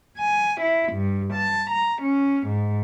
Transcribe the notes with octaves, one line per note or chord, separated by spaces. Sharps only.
G#5
E4
G2
A5
A#5
C#4
G#2